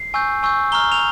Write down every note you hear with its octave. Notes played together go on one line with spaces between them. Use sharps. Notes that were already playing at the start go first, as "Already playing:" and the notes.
Already playing: C7
G#5 C#6 E6 G6
G#5 C#6 E6 G6
A#5 C#6 F6 G7
F7